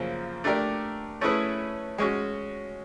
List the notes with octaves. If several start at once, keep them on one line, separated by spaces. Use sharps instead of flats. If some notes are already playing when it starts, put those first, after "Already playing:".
Already playing: F#2 C#3 F3 A#3
A3 D4 G4 A#4 D5
A3 C#4 E4 G#4 B4
G#3 C#4 F#4